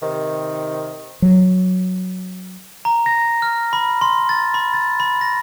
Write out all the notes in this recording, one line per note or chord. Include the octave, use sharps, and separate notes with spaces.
C3 D#3
F#3
A#5
A#6
F6
B5
C6
A6
B5
A6
B5
A#6